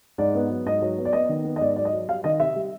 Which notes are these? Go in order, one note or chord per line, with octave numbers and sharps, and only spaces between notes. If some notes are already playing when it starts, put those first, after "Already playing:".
G#2 D5
B3
F#3
G#2 D#5
F#3
B3
D5
B3 D#5
D#3
B3
D#5
G#2 D5
F#3 D5
D#5
F#3
G3 F5
D#3 D#5
C3 E5
G3